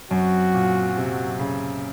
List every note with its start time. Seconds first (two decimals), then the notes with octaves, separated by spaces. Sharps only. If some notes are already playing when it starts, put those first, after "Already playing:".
0.11 F#2 F#3 C4 F#4
0.54 A#2
0.97 C3
1.39 C#3